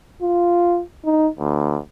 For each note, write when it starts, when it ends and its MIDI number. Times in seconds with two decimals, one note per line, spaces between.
0.22 0.81 65
1.05 1.28 63
1.39 1.79 38